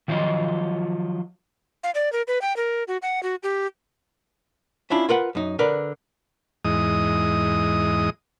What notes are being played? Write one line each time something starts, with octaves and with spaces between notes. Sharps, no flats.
D#3 F3 F#3 F4 D#5
F5
D5
A#4
B4
G5
A#4
F#4
F#5
F#4
G4
C#4 D4 E4 F4
F4 A#4 B4 F#5
F#2 D#4
D3 A#4 B4 D5
E2 G#2 D#5 D#6